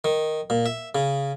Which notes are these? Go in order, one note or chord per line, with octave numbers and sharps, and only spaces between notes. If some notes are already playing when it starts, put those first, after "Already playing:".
D#3
A#2
E5
C#3